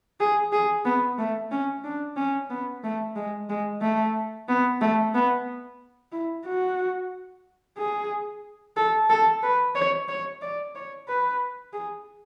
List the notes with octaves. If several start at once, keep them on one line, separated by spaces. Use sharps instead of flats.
G#4
G#4
B3
A3
C#4
D4
C#4
B3
A3
G#3
G#3
A3
B3
A3
B3
E4
F#4
G#4
A4
A4
B4
C#5
C#5
D5
C#5
B4
G#4